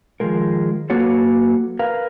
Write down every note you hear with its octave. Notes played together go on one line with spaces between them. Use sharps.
D#3 F3 G#3 A#4
F#3 A#3 F#4 A4 B4 C#5
A#4 B4 F5